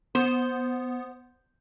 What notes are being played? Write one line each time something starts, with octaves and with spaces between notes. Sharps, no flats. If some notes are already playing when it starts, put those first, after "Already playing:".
B3 C5